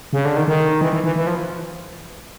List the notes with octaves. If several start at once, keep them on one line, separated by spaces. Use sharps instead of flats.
C#3
D3
D#3
D#3
E3
E3
E3
E3
F3